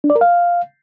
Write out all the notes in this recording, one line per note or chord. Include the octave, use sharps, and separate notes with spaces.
D4
D5
A#4
F5